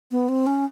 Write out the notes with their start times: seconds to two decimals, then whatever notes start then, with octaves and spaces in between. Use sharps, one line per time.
0.11 B3
0.29 C4
0.47 C#4